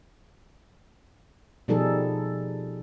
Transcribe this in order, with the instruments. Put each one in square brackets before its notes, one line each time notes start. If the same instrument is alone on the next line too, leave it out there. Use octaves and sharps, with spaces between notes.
[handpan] B2 F3 G3 D#4 G#4 A4